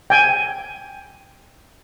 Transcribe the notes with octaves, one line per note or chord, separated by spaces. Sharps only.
G5 G#5